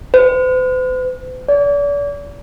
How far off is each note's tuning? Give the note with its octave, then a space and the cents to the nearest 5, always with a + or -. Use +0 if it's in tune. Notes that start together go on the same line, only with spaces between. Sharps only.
C5 -45
D5 -40